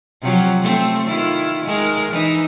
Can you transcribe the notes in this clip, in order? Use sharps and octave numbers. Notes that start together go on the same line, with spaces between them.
C3 F3 F#3
A3 C4
D#3 E4 F4
D#3 G#3 A#4
E3 D#4